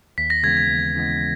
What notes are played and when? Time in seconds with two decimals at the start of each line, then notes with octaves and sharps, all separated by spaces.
0.18 D#2 B6
0.30 A#6
0.43 C#3 E3 G#3 B3 G#6
0.57 G#6
0.69 D#2
0.95 C#3 E3 G#3 B3